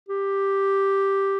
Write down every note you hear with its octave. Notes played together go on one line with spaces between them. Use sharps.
G4